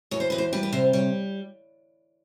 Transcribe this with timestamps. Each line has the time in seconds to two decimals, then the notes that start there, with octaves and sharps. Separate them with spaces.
0.11 E2 C#5
0.20 C5
0.30 E2 B4
0.38 C5
0.53 G3 B4
0.63 B4
0.72 C3 C5
0.93 G3 C#5